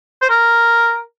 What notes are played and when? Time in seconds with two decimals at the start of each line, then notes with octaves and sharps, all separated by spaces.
0.21 C5
0.30 A#4